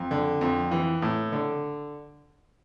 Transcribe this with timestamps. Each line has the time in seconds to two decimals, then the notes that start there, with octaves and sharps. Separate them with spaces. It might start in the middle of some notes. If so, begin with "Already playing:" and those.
Already playing: F2
0.11 D3
0.41 F2
0.71 E3
1.02 A2
1.32 D3